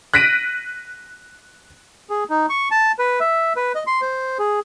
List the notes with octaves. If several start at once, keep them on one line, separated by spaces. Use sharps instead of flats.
F#6 A#6 B6 D7 D#7
G#4
D#4
C#6
A5
B4
E5
B4
D#5
C6
C5
G#4